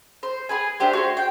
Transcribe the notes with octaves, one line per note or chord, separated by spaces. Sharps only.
C5
G#4 B4 G#5
A3 D4 G4 C5
F#4 G#4 C5
G5